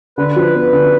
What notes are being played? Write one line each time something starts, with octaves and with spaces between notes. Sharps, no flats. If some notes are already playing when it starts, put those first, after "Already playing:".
D3 B4
F3
B3
D3